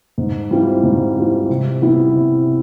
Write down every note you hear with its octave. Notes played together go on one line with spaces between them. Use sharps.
G#2
E3 G3 C4 F4
G#2
E3 G3 C4 F4
C3
E3 G3 B3 E4
C3